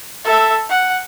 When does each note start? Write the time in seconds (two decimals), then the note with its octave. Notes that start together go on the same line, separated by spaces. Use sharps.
0.25 A4 E5
0.70 F#5